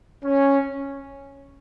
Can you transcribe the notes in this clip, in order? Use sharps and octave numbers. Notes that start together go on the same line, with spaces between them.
C#4